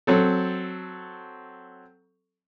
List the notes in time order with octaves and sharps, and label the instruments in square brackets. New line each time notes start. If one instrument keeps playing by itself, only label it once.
[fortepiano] F#3 C4 A4